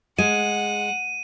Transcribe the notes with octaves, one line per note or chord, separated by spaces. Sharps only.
G#3 F#5 D#7